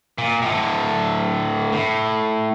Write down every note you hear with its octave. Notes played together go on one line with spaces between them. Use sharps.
A#2
A2 D3
A2